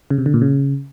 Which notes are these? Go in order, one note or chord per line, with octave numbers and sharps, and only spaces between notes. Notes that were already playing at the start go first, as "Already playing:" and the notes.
C#3
C3
D3
A#2
C#3